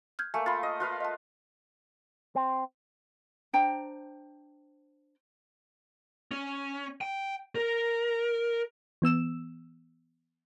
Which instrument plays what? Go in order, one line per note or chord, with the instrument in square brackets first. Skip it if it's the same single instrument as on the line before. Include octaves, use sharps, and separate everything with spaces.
[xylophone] F6 G6 G#6
[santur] A3 A#3 [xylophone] G#5
[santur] F4 [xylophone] B5 A6
[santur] D#5
F4 B4 F5
[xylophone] D#5 A5
[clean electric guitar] C4
[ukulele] D4 C5 G5 A#5
[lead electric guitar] C#4
G5
A#4
[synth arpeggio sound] E3 B3 E6 E7